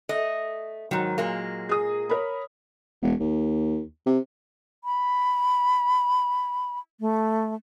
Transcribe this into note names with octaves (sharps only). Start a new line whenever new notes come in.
A3 D#5
G#2 D#3 F#3
A#2 G#3 A#3
G#4 D#6
A#4 C#5 B5
E1
D#2
C3
B5
A3